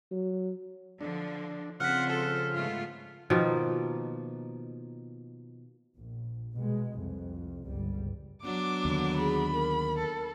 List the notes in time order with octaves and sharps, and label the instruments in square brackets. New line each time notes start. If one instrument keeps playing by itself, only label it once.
[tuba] F#3
[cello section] D3 F3 [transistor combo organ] D4
[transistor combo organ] C#3 F3 [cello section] C4 F4 C5 [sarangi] F#5 [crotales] F6 B6
[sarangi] A4
[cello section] G#2 A3 B3 [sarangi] F4
[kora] B2 D#3 F3 A#3
[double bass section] A#1
B2 G#3
C2 F2
G1 C#2 G3
[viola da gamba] F#3 B3 D4 [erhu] D6
[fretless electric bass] D#2 D3
[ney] G#4 [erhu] B5
[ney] A#4
[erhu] A4